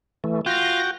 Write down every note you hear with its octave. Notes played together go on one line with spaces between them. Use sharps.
E3 A3
F4 F#4 G5 A#6